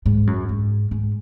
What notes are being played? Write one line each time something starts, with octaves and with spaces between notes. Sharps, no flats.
G#2
F#2
G#2
G#2